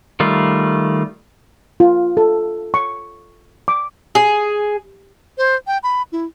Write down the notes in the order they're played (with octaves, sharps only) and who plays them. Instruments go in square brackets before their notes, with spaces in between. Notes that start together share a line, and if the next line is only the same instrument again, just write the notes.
[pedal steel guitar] D#3 G3 A3 F4
[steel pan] F4
A4
C#6
D6
[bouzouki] G#4
[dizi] C5
G5
B5
E4